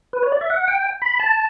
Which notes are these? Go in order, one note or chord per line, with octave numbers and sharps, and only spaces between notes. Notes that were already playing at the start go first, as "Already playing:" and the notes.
B4
C#5
D5
E5
F#5
G5
B5
A5